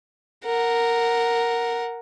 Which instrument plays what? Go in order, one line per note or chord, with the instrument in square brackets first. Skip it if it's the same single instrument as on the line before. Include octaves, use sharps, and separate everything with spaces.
[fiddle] A#4 F#5